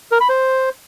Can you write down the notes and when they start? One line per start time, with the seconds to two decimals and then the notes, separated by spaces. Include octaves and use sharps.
0.12 A#4
0.20 B5
0.29 C5